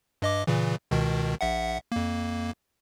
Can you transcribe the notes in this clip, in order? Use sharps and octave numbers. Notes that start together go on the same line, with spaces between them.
G2 D#5 D6
A#2 C#3 E3
C#2 B2 D#3
A#1 E5 F#5
F2 A#3